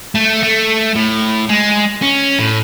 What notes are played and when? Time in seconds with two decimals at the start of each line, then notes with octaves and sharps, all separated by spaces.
0.15 A3
0.43 A3
0.95 A2
1.49 G#3
2.02 C#4
2.39 A2